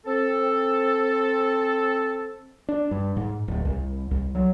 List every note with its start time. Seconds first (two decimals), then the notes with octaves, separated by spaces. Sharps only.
0.06 C4 A4
2.69 D4
2.91 G2
3.17 G#2
3.48 D1
3.65 C2
4.11 C2
4.35 F#3